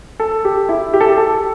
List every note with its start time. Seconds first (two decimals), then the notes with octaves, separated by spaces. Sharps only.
0.20 A4
0.45 G4
0.69 E4
0.93 G4
1.01 A4
1.09 G4
1.17 A4